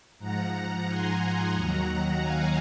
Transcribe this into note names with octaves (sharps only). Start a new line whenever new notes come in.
G#2 F3 F#5 A#5
G#5 C6
G#5 C6
D#2 D#3 F#3 F#5 A#5
F#5 A#5
F5 G#5